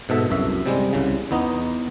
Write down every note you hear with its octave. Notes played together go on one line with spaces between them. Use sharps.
G#2 B2 A4 E5
C2 F#2 E5
C3 G3 G#3
C2 C#3
E2 B3 D#4 D#5